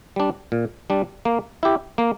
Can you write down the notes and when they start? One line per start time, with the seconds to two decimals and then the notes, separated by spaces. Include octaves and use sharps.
0.16 G3 D4
0.52 A#2
0.90 G3 D4
1.25 A#3
1.63 E4 G4
1.98 A#3